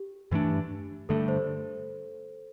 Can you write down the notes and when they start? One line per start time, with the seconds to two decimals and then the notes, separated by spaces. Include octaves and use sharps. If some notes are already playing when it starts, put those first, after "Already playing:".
Already playing: G4
0.31 G2 E3 A3 D4
1.09 G2 D3 A3 A4
1.28 C5